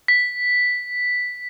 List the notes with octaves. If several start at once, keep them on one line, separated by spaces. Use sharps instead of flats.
B6